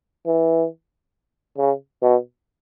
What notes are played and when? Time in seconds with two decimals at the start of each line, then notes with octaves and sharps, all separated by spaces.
0.26 E3
1.58 C#3
2.02 B2